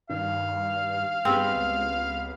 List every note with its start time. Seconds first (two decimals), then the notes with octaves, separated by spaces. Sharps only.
0.09 G2 D#3 F5
1.25 G2 B3 C4 G4 G#4
1.56 C#2